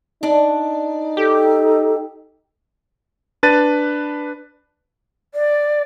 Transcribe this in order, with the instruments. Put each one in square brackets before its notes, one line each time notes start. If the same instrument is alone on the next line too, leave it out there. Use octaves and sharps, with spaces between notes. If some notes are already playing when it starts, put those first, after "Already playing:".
[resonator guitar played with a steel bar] D4 D5 [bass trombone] D#4
[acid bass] G4 [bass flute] A4
[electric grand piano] D4 B4 A5 A6 D#7
[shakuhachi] D5